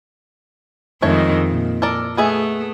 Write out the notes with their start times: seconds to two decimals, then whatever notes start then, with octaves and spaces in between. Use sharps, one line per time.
1.02 F2 D#3 G#3 A3 C#5
1.47 A#2
1.82 A4 A#4 D5
2.17 A3 B3 G#4 E5